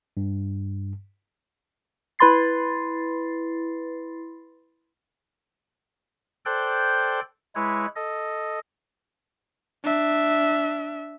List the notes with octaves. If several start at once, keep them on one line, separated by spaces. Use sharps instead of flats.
G2
E4 B4 B5 C6 A6 C7
A4 C5 D5 G5 F#6 G6
G#3 E4 B4 C#5
A4 D#5
D4 E5